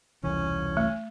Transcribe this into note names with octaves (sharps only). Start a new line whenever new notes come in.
E1 C2 E3 C#4
A3